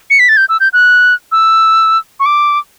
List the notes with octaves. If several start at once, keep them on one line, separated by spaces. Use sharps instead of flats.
C#7
B6
A6
G6
E6
G6
F#6
E6
C#6
D6